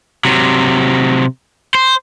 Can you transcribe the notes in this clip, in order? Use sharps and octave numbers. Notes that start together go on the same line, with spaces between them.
C3 F#3
C5